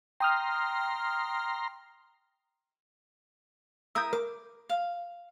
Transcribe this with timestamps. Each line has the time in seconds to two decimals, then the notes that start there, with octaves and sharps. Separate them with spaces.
0.20 G5 A#5 C6 D#6 F6
3.95 E4 A#4 D#6 E6 G6
4.13 A#4 D6
4.69 F5